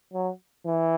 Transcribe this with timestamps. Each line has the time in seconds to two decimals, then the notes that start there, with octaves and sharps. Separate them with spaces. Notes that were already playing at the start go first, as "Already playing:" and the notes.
0.14 F#3
0.66 E3